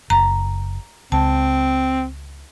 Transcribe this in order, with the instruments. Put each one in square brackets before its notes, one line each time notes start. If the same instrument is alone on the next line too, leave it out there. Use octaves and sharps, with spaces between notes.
[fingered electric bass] F#1 [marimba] A#5
[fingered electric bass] C#2 [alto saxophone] C4 [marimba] A5